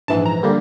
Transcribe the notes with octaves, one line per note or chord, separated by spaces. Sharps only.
A#1 G#2 E3 A5
A#5
D3 G3 A#3